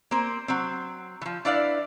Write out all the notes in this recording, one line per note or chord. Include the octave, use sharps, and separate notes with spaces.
A#3 C4 C5
F#3 C4
E3 F3
D4 E4 B4 D5 F5